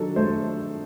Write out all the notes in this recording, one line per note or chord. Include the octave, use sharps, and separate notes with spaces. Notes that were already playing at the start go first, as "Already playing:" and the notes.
Already playing: D#3 F#3 D4 A4
A3 C5